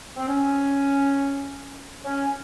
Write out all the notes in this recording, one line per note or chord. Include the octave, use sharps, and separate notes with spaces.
C4
C#4
C#4